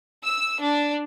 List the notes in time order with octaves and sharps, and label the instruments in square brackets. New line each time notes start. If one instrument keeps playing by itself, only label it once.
[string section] E6
D4